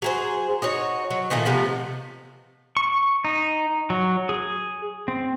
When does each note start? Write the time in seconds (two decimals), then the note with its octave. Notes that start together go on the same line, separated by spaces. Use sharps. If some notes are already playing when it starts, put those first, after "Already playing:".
0.02 F#3 G#4 C5
0.62 D#4 F#4 C#5
1.10 F#3
1.30 A#2 D#3 A3 A#3
1.45 C3 F3 A3 B3
2.77 C#6
3.25 D#4
3.90 F#3
4.29 G#4
5.08 C4